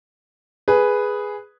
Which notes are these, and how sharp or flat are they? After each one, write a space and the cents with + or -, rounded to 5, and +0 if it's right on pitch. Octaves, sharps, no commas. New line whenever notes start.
G#4 +0 B4 +0